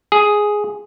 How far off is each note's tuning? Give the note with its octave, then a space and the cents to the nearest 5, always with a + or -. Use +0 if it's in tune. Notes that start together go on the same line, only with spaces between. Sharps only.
G#4 +0